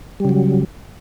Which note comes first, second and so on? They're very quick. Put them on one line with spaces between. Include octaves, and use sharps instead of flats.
G3 C#3 F#3